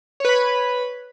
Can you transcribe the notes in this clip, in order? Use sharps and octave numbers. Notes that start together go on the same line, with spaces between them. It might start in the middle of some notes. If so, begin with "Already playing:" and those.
B4 C#5 B5